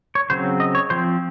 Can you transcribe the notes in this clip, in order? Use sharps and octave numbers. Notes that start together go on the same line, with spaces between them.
C#5
C#3 F#3 C4 C5
D#5
C#5
F3 C4 C5